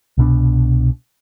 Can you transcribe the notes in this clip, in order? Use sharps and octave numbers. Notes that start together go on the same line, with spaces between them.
C2 B2 D4